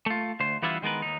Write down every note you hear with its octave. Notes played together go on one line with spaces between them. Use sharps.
A3 F4
D2 C5
E3 G3 B3 D4 E4 F4
D#3 G#3 B3 A#4 B4
D#2 D#4